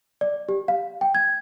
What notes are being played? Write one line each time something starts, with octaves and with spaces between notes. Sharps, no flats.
D5
G4
F5
G5
G#6